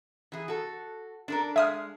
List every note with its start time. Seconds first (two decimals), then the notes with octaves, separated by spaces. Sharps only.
0.32 E3 G#4
0.48 F#4 A4
1.28 D4 A4 A#4
1.56 G#3 E5 D#6 F6